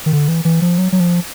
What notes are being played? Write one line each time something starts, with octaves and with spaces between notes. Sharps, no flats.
D#3
D3
E3
E3
F3
F#3
F#3
F3